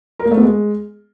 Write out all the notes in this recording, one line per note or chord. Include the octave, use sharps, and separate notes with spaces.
A#4
A#3
A3
B3
G#3